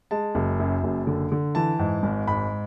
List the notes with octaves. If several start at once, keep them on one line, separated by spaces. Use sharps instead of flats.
G#3 A5
F#1
F#2
F#1
D3
D3
E3 A5
G#2
G#1
G#2 B5